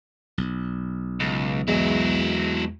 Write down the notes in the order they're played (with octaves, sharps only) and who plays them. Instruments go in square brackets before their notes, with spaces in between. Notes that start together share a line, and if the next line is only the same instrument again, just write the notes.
[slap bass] B1
[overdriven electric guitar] C#2
[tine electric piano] E2 G#3 [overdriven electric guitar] F#3 E4